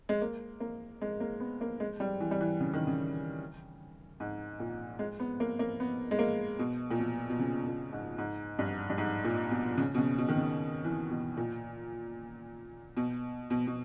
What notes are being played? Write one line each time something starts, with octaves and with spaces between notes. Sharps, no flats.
G#3
A#3
A#3
G#3
A#3
B3
A#3
G#3
G3
E3
G3
E3
C#3
D#3
C#3
G#2
A#2
G#3
B3
A#3
A#3
B3
G#3
A#3
B2
A#2
B2
B2
C#3
A#2
G#2
G#2
G2
G2
G#2
A#2
B2
C#3
B2
C#3
B2
D#3
C#3
E3
B2
A#2
B2
B2
B2